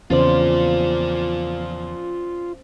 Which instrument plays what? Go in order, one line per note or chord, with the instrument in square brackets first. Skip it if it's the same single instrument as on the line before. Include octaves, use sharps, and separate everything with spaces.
[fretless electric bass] E2 C#3 [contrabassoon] F3 [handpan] C#4 C5 [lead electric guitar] F4 D5